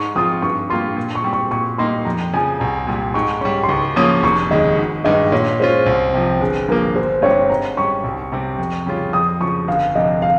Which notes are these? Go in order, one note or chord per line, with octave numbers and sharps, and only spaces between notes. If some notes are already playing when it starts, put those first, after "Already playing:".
Already playing: G#2 C#6
F3 C4 F4 D#6
G2 C#6
G3 A#3 F4 C6
A#2
C#6
G3 C4
C#6
A#2 C#6
G3 A#3 D#4 C6
F2 A#5
C#3 F3 G#5
C2 A#5
A#2 G3
G#2 C#6
G3 C#4 C#6
C6
C#2 C#6
C#3 F3 A#3 C#4 D#6
F1 C#6
D#2 C#3 G#3 D#5
G#1
G2 D#3 G#3 D#5
A#2 C#5
G#3 C#4 F4 C5
C2
C3 F3
G1 G#4
G2 F3 A#3 A#4
G1 C5
G2 G3 C4 C#5
G#2 A#5
G3 C#4 C#6
C2
C3 G3 C4
F2
C#3 G3 C#4 F4
F2 D#6
C#3 F3 C#6
G1 F5
F2 C3 D#5
F5